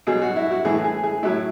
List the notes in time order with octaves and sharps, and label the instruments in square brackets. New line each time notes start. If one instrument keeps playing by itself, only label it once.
[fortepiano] B2 F#3 G#4
F#4
E4
F#4
A2 E3 G#4
G#4
G#4
A2 F#3 E4